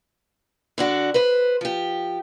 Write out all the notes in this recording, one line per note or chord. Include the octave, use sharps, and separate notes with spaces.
D3 D4 F#4
B4 C5
F3 G4